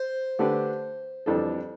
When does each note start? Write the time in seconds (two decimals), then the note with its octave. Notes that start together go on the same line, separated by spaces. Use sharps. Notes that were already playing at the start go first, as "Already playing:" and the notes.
Already playing: C5
0.39 D3 A3 D4 G4 B4
1.26 F2 E3 G3 D4 A4